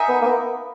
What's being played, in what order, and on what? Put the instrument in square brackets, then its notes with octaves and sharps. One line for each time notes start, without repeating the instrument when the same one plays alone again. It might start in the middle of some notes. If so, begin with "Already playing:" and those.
Already playing: [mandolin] D#4 A#4 E5 G#5
[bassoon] B3
A#3
B3